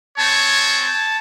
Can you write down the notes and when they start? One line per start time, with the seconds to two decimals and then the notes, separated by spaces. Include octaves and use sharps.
0.18 G#3 C4 C#5 A5